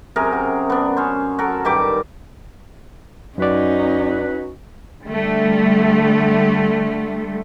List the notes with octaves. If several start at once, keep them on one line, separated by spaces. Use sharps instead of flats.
F#2 C3 G#4 A#4
F#4
B3 D4
C#4 C5
F#4 A4 A#4
G2 D#3 G4 D6
F#2 C#4 D#4 F#4 B4 D5
D3 G3 A3